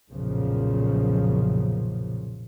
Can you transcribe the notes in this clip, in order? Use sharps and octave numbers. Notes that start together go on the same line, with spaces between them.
B1 F#2 A#2 C#3 F3